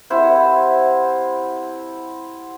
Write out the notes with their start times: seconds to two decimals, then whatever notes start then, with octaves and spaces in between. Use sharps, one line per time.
0.10 C3 E4 C5 F#5